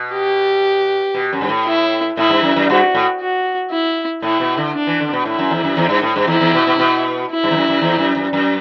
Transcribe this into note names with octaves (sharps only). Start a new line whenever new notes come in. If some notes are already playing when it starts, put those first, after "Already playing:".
Already playing: B2
G4
B2
F#2
G2
A2
E4
A2 E4
G2
F#2
F#2
G2 F#4
A2
F#4
E4
A2 E4
B2
D3
D4
E3
D3
B2
A2 E4
F#2
E2
F#2
E2
G2
A2
G2
E2 E4
E2
B2
B2
C3
B2
E4
G2
E2
F#2
F#2
E2
F#2
F#2
F#2